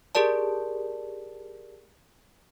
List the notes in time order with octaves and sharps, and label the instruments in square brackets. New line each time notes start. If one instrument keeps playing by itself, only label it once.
[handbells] G4 G#4 A#4 D5 A5